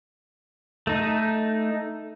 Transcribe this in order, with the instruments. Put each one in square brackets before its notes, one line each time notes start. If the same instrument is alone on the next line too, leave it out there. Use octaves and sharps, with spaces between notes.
[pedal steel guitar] A3 D#4